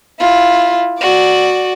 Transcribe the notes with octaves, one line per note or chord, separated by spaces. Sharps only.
E4 F4
F#4 D5